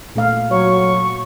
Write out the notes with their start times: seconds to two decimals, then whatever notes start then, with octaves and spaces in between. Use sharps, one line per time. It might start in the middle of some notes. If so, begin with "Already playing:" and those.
0.15 A#2 A3 F5
0.51 F#3 C#5 C#6